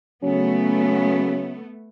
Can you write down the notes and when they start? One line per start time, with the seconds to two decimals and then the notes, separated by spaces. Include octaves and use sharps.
0.23 C#3 F#3 A3 B3 C#4